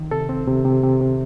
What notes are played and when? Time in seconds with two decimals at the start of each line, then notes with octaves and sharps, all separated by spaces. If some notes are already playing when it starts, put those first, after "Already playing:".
Already playing: D#3
0.11 C3 A4
0.29 C4
0.48 C3
0.65 C3
0.83 C3
1.01 C3